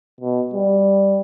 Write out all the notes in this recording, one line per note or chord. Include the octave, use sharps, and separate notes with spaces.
B2
G3